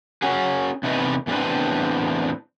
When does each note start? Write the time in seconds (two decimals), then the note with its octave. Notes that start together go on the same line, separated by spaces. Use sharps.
0.22 C#4 F#4 G#4
0.83 E2 C3 A3 D#4 B4 D#5
1.27 E2 A2 G#3 C4 D4 B4